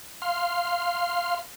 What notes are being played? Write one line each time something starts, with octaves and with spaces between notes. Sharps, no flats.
F5 C6